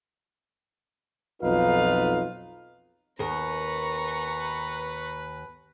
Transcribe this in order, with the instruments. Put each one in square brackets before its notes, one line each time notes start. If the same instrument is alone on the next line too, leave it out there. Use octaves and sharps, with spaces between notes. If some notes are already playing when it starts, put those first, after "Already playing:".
[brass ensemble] B1 F2 D#4 F4 B4 F5
[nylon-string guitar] D#2 A#4 [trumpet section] B4 [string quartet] A#5 C#6